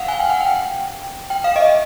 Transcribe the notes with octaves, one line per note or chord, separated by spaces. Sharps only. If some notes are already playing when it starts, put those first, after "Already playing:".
Already playing: F5 F#5
G#5
G5
F#5
G5
G5
F5
D#5
E5